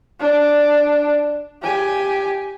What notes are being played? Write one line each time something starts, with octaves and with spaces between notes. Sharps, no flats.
D4
G4 G#5